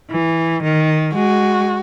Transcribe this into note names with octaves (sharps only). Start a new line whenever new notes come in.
E3
D#3
G#3 F#4